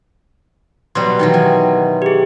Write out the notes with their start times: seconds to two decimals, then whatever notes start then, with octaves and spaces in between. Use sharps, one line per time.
0.95 B2 F#3 G3 C6
1.19 D#3 E3 F#3
1.34 G#5
2.02 G4 G#4